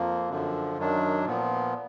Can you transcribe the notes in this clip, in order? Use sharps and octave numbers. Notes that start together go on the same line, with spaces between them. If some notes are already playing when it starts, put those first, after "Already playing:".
Already playing: F2 F3 A#3
F#2 D3 F3
F#2 D#3 F#3 D4
A#2 F3 B3